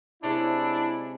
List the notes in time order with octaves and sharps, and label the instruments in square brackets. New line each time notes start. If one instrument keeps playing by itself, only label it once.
[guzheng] C3 G#3 C#4 [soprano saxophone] D4 [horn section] E4